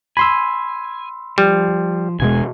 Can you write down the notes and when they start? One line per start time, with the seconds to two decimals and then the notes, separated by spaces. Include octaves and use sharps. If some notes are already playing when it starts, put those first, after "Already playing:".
0.17 G#5 B5 C6 E6
1.38 F3 G3
2.20 E1 B2 G#3 G#5